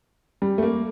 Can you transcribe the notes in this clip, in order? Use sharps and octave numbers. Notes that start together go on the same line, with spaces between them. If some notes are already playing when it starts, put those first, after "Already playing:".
G3
A3
A#3